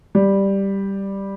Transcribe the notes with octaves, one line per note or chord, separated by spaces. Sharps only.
G3